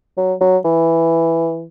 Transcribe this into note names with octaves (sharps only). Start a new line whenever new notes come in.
F#3
F#3
E3